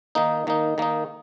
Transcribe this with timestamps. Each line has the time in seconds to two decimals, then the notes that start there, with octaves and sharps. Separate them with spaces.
0.15 D#3 A#3 D#4
0.47 D#3 A#3 D#4
0.78 D#3 A#3 D#4